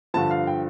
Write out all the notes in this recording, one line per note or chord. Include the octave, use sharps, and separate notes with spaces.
G2 D3 F3 A5
F5
G5